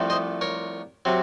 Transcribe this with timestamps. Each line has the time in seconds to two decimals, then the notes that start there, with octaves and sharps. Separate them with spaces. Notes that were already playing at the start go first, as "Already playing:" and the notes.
Already playing: C2 C3 F3 A3 C4
0.10 C5 D#5
0.41 A#4 C#5
1.05 C3 F#3 C4